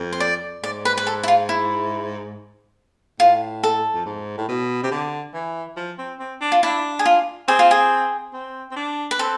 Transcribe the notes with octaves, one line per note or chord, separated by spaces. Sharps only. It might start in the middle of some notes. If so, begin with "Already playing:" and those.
Already playing: F2
C5
D5
G#2 D5
B4
B4
A4
E4
F4
E4
A2 F4
A4
F2
G#2
A2
B2
C3
D3
E3
F3
C4
C4
D4
F4
D4 E4
G#4
F4
C4 G#4
F4
G#4
C4
C4
D4
B4
C4 A4